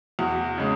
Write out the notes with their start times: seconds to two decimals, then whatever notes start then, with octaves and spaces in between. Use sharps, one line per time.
0.19 E2 F#4
0.58 C#3 G#3